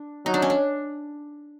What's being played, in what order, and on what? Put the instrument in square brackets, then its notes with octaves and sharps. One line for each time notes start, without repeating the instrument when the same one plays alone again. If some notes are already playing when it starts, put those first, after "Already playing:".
Already playing: [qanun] D4
[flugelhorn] F#3 [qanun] D#4
[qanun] D4
C#4
D4